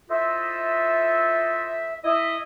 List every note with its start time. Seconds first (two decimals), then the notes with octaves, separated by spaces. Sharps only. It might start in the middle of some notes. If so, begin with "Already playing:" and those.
0.10 E4 F4 A4 C5 D#5 E5
2.04 E4 D#5 E5